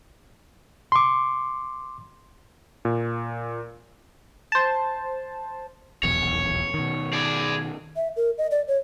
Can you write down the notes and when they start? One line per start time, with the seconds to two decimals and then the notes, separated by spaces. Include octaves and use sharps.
0.92 C6 D6
2.85 A#2
4.52 C5 A5
6.03 D#1 B1 E2 C#5
6.74 B2 D#3
7.13 G#4 D5
7.96 E5
8.16 A#4
8.38 D#5
8.51 D5
8.68 C#5